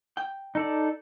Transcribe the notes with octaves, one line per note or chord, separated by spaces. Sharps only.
G5
D#4 A4 D5